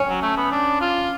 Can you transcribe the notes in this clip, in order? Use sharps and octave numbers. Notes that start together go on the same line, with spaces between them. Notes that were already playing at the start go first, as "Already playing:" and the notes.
Already playing: C#4
F#3
A3
B3
D4
F4